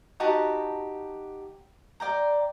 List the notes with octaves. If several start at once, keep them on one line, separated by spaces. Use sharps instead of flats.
D#4 F#4 G4 A5
D5 G5 A#5